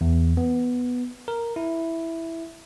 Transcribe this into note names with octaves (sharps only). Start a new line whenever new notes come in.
E2
B3
A#4
E4